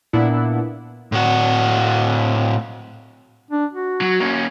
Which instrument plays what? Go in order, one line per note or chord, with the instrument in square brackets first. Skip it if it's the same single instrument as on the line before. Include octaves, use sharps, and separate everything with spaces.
[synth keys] A#2 B3 D4 E4 F#5
[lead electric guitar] A2 F#4
[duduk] D4
F#4
[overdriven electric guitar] F#3
A#3 C#4